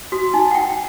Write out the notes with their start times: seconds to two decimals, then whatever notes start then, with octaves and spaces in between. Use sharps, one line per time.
0.12 F#4
0.34 D#4 G#5
0.51 F#5 G5